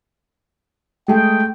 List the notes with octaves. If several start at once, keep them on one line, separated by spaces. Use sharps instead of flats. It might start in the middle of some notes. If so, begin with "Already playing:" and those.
G#3 A3 G#4 G5